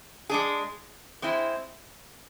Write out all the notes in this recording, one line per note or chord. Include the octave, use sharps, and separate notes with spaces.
G#3 D4 G#4
G#3 C4 E4